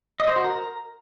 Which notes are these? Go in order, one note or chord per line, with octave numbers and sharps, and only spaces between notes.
D#5
C5
F#4
A#4